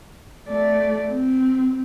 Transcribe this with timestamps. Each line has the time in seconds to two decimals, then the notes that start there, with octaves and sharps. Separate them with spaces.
0.48 A3 D5
1.09 C4